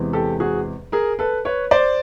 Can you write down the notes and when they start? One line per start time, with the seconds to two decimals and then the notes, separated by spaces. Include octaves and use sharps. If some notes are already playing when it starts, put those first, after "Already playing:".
Already playing: E2 C3 E3 G#3
0.13 G4 A4
0.40 F#4 G#4
0.92 G#4 A#4
1.19 A4 B4
1.45 B4 C#5
1.71 C5 D5